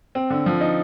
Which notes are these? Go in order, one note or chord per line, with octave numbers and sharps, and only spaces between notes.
C4
D3
F3
D#4